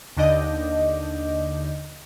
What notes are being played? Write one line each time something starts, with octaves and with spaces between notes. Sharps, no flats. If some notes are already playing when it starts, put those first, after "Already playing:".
D#2 D3 D4 D#5 D6 G6